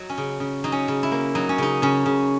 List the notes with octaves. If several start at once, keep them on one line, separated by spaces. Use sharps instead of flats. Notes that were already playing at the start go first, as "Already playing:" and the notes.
Already playing: F#3 D#4
C#4
C#3
C#3
F#3 D#4
C#4
C#3
E4
A#3
F#3 D#4
C#4
C#3 D#4
C#3 C#4
C#3